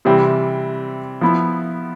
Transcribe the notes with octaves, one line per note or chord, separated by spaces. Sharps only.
C3 E3 G3 C4 G4
F3 B3 E4